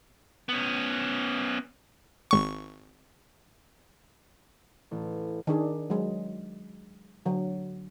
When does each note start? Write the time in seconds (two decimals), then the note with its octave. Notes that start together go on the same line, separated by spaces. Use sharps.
0.49 B3 C#4
2.31 G#1 C#6
4.91 A1
5.47 D#3 D4 G#4
5.90 F#3 G#3
7.26 D3 F#3